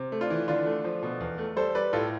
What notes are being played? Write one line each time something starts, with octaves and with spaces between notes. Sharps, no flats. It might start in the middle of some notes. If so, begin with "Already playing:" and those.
Already playing: C3
A3
D4 F4
E3
D3 D4 F4
A3
F3
B2
E2
A3
G3 A4 C5
G3 B4 D5
A2 F4 A4